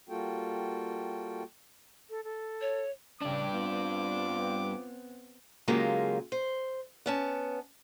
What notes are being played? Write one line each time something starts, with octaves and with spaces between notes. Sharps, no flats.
G3 A#3 F4 F#4 A4 G5
A4
A4
C#5
A1 G2 C#3 D4 D6
B3 C4 F4
C#3 F#3 G#3 A#3 F4 G4
C5
B3 C#4 A5